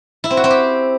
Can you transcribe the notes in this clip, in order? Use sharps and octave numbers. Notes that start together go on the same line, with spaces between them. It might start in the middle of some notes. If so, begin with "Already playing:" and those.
E4
C4
F#4
C4
G4